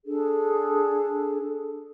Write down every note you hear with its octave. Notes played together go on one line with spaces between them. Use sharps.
D4 G#4 A4